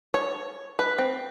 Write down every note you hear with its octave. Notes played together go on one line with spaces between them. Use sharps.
C#5
B4
C4